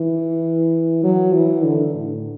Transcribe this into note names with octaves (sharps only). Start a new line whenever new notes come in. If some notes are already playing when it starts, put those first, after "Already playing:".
Already playing: E3
F#3
E3
D3
A2